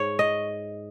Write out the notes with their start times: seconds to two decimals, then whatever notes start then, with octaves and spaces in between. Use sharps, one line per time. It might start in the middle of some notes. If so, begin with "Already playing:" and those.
Already playing: G#2 C#5
0.19 D#5